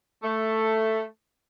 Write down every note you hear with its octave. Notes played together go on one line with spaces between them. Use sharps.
A3